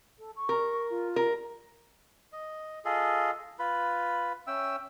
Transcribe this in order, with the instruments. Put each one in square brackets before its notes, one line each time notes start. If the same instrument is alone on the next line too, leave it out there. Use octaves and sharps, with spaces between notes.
[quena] A4
C#6
[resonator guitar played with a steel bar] A#4
[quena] F4
[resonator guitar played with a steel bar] A#4
[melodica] D#5
F4 G#4 A4 D#5
F4 B4 B5
C#4 E5 G5 E6